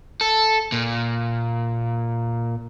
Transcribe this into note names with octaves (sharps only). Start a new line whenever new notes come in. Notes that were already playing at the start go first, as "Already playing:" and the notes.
A4
A#2